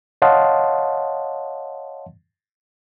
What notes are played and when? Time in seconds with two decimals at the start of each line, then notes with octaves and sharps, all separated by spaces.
0.22 C#5 D#5 F5 F#5 A5 C6